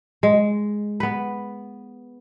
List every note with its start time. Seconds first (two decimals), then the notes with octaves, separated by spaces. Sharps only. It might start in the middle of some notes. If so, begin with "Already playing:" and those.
0.23 G#3
1.00 B3 B4